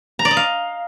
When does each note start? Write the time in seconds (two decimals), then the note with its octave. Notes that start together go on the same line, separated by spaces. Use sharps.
0.19 A#5
0.25 D5
0.31 D#5
0.37 F5